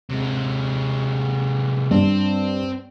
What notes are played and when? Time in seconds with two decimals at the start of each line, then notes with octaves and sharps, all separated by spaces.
0.10 C3 G#3
1.91 G2 C4